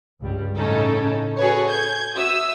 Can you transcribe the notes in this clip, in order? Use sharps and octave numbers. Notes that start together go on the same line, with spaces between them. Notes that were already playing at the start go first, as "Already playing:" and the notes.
C#2 G2 G3
A2 C#3 C#4 D#4 A4
F#4 G#4 A4 B4 C#5
G6 G#6
F#4 E5 D#6 E6